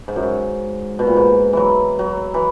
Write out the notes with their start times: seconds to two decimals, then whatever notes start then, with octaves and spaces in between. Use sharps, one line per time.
0.08 G#2
0.16 F#2
0.23 G#2
0.99 B2
1.07 A#2
1.16 G#2
1.53 E3 F#3
1.99 F#3
2.34 E3